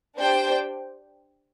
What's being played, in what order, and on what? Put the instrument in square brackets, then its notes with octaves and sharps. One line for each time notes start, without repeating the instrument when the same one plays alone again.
[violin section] D4 G4 C5 G5